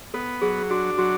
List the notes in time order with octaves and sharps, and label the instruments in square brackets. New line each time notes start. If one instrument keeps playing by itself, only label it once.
[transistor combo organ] B3 [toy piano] A4
[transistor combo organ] F#3 [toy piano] G#4
[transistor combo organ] D4 [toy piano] F#4
[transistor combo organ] F#3 [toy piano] F#4